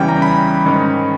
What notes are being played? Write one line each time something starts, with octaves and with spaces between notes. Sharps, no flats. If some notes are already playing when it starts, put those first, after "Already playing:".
Already playing: E2 C#3 E3 G3 C#4 G5
A#5
B5
G#2 D#3 G#3 C#4